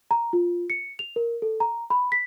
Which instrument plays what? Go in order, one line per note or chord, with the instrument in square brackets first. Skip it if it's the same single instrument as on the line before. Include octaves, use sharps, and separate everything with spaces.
[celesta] A#5
F4
C#7
F7
A#4
A4
A#5
B5
B6